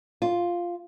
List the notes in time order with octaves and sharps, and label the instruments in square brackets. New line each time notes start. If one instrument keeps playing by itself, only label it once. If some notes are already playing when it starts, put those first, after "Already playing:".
[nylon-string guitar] F4